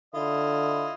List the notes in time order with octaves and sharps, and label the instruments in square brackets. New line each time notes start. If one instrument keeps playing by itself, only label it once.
[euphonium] D3 [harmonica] E4 F4 D#5